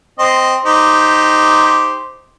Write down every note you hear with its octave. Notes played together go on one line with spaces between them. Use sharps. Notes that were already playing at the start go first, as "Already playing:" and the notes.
C4 D#5 C6
D#4 G4 C5